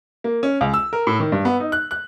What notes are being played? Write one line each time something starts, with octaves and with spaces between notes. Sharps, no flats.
A#3
C#4
C#2
E6
A#4
A2
D#3
G2
B3
D#4
F#6
F#6